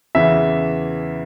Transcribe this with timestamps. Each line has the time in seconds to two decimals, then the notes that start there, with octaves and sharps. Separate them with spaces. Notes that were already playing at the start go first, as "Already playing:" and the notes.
0.15 E2 C#3 E3 E5